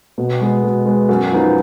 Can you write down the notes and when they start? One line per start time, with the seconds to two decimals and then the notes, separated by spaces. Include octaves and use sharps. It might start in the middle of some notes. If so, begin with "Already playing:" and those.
0.18 B2
0.41 G#3 B3
0.64 B2
0.86 G#3 B3
1.09 F#2
1.32 F3 B3 D#4